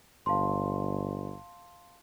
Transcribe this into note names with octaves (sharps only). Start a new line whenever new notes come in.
G1 F5 A5 C6